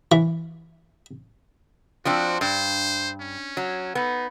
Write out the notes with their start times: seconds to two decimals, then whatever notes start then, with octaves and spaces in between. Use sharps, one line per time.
0.12 E3
2.05 F3 C4 D4 F#4
2.41 G2 C5
3.20 C#4
3.57 F#3
3.95 B3 D#4